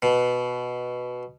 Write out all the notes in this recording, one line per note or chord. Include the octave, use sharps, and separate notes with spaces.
B2